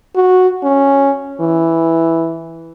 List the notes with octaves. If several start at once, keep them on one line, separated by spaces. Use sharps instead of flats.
F#4
C#4
E3